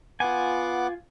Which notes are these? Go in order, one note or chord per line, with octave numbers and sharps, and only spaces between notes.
B3 F4 F#5 G#5 D6